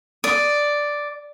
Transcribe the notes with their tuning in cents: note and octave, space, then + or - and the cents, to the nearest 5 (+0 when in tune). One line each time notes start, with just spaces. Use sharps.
D5 +0 D#6 +0